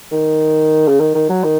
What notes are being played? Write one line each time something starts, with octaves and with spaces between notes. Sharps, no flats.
D#3
C#3
D#3
D#3
F#3
D#3